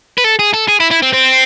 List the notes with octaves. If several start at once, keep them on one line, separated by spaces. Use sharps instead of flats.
B4
A4
G#4
A4
G#4
E4
E4
C4
C4